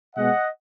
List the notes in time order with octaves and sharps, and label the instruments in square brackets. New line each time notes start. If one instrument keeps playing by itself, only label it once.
[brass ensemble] B2 G#3 B3 D#5 F#5